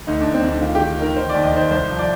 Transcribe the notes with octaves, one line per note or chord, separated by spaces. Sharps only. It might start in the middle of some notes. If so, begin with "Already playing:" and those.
D2 D#4
D4
D2
C4
D2 D4
D#3 F4
D#3 G4
D#3 A#4
D#3 C5
D5
D#2
D#5
D#3 C5
C2 C5
F3
D5